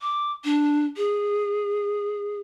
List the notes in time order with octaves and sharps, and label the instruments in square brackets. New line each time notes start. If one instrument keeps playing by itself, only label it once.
[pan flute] D6
D4
G#4